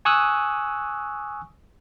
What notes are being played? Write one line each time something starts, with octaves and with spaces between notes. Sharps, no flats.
G#5 C#6 D#6 E6 F#6